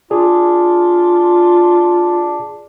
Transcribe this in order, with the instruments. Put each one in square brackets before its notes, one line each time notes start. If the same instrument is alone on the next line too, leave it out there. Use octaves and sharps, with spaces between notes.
[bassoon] D4 [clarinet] F4 [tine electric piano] G#4